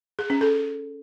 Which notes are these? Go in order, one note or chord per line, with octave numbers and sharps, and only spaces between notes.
G#4
C#4
A4